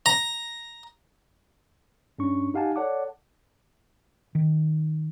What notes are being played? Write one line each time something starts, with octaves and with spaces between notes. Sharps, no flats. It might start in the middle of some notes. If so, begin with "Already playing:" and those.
A#5
G2 C#4 D4 C#6
D#4 G4 F5 F#5 G#5 A5
A4 C#5 D5 F#5 A5 D6
D#3